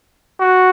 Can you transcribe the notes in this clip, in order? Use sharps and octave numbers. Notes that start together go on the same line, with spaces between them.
F#4